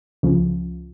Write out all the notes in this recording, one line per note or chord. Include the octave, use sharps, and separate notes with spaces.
C#2 C#3 F3